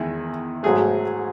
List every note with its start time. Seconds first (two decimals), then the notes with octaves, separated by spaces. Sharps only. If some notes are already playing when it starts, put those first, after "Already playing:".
Already playing: E2 D#3 G#3 E4
0.63 G#2 F#3 A3 G#4